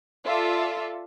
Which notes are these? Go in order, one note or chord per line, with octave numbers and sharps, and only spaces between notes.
F4 A4 D5 E5